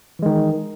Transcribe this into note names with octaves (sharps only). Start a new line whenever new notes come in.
D#3 E3 G#3